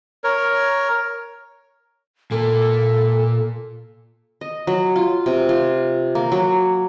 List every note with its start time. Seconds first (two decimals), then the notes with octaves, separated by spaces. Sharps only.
0.24 A#4 C#5
2.31 A#2 A#3 A4
4.41 D#5
4.67 F#3
4.96 F4
5.26 C3
5.49 F4
6.15 A#3
6.32 F#3